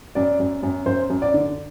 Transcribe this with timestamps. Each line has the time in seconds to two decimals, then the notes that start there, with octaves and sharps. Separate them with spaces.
0.15 F#2 D5
0.40 F#2
0.63 F#2
0.86 F#2 C5
1.10 F#2
1.22 D5
1.34 D3